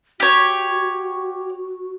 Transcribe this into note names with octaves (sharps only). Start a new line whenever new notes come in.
F#4 G4 C#5